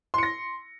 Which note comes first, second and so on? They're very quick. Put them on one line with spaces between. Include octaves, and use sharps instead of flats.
C6 C#7 A#6